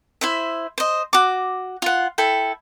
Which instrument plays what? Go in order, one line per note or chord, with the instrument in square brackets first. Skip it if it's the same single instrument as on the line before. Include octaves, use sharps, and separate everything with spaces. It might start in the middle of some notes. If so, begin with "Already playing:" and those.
[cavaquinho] E4 C5 E5
C5 D#5
F#4 D6
F4 F#5
E4 A4 G5